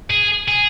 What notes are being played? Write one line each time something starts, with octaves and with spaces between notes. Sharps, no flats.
G#4
G#4